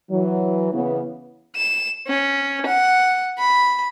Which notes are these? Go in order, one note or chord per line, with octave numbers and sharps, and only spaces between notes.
E3 F#3
C#3 E3 B3
E7
C#4
F#5
B5